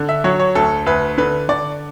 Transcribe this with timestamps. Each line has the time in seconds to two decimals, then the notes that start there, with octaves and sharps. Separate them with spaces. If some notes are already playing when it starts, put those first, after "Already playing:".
Already playing: D3
0.09 E5
0.24 F#3 C#5
0.39 C#5
0.55 D2 A4
0.86 D2 B4
1.18 D3 B4
1.49 D3 D5